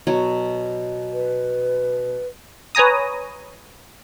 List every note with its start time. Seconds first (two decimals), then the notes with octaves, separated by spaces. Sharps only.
0.07 B2 F#3 C#5
1.13 B4
2.75 B4 C#5 G#5 A#5 D#6